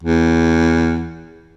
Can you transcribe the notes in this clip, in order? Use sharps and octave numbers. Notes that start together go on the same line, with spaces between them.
E2